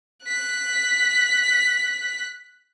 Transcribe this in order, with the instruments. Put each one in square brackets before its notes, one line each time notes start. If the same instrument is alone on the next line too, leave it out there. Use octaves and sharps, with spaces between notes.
[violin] F#6 B6